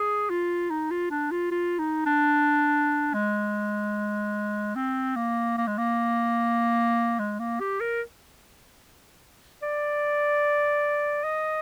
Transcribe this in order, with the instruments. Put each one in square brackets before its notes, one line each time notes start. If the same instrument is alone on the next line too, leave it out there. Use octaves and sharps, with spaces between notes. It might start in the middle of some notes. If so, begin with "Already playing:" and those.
Already playing: [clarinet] G#4
F4
D#4
F4
D4
F4
F4
D#4
D4
G#3
C4
A#3
A#3
G#3
A#3
G#3
A#3
G4
A#4
D5
D#5